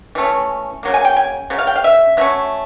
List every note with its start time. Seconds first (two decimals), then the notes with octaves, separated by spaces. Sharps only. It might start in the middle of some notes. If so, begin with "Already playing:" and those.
0.15 E3 A3 C#4
0.83 C#3 F#3 A#3
0.94 G#5
1.05 G5
1.17 G#5
1.50 C#3 F#3
1.58 F5
1.67 G5
1.76 F5
1.84 E5
2.17 F#3 A3 C#4 E5